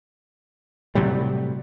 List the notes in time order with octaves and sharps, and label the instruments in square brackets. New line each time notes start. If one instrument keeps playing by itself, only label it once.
[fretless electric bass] A2 C3 F#3 G3